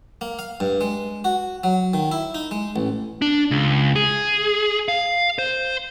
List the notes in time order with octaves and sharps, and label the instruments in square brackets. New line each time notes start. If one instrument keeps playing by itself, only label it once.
[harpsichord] A#3
F5
G2
G#3
F#4
F#3
D#3
E4
D#4
G#3
A1
[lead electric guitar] D4
C#2
G#4
F5
C5